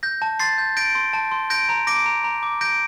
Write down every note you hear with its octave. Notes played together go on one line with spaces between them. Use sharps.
G6 A#6
A5
C6 A6 C7
G6
G6 A#6 D7
C6
A5
C6
G6 A#6 D7
A#5
D6 A#6 D7
A#5
A#5
D6
G6 A#6 D7